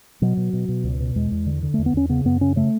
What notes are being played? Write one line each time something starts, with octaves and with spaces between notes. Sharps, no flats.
B2 F#3
B2
B2
B2
C#2
B2
E2 G#3
E2
D3
D3
A3
E2
B3
E2 C#4
C#3 B3
F#2 B3
C#3 C#4
C#3 A3